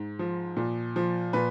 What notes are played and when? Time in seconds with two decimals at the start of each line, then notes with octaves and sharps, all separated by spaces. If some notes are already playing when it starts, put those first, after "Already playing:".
Already playing: G#2
0.19 F3
0.57 A#2
0.96 F3
1.33 A#2 B4